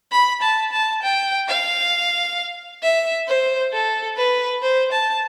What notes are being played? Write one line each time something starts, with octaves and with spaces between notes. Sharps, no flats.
B5
A5
A5
G5
F5
E5
C5
A4
B4
C5
A5